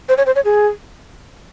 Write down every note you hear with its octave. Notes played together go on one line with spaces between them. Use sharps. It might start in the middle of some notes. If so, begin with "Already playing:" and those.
C5
C#5
C5
C#5
G#4